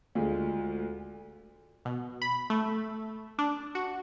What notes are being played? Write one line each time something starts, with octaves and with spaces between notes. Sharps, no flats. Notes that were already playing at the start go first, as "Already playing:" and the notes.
D2 G#3 F4
B2
B5
A3
D4
F#4